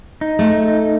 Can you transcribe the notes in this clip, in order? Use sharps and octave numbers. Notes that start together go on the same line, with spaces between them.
D#4
A3